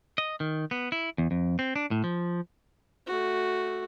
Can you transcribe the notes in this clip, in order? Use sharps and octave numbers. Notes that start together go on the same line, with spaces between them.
D#5
D#3
B3
E4
E2
F2
C4
D4
A2
F3
A3 F#4